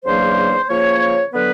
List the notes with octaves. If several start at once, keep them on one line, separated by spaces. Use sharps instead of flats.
E2 C#3 F#3 A#3 D4 C5
C#3 F3 A#3 C#5
D3 F#3 B3 B4